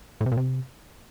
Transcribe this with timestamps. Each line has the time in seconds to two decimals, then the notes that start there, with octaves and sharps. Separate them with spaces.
0.21 A2
0.26 C3
0.32 A#2
0.37 C3